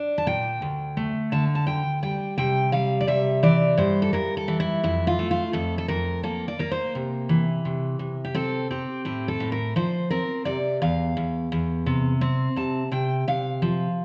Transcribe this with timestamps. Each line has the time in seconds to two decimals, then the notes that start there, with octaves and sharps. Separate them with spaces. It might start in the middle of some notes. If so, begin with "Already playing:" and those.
Already playing: D4
0.18 A5
0.26 A#2 G5
0.62 D2
0.97 A3
1.32 D3 A5
1.55 A5
1.67 D2 G5
2.03 G3 G5
2.38 C3 G5
2.72 G3 F5
3.01 D5
3.07 C3 E5
3.43 E3 D5
3.77 G2 C5
4.02 A4
4.13 G2 A#4
4.37 A4
4.48 E3
4.60 E4
4.83 F2 E4
5.07 F4
5.19 A3
5.31 F4
5.53 F2 A4
5.78 A4
5.88 F2 A#4
6.23 A#3 A4
6.48 D5
6.59 A#3 A#4
6.71 C5
6.95 C3
7.29 E3
7.65 C3
7.99 C3
8.25 G4
8.34 C4 A4
8.71 C4 G4
9.05 A2 G4
9.28 A4
9.40 A2
9.52 A#4
9.76 F3 C5
10.10 C4 A#4
10.45 C3 D5
10.82 E2 F5
11.17 E2
11.52 E2
11.86 C3
12.21 C4
12.56 C3 A5
12.91 C3 G5
13.28 C3 F5
13.62 F3